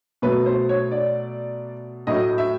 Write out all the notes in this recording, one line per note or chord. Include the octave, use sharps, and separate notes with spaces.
B2 F#3 A3 B4
C5
C#5
D5
A2 F#3 A3 D#5
E5